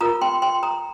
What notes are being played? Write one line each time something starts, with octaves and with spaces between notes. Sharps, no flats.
F4 A#4 A#5 D#6
G5 C6
G5 C6
A#5 D#6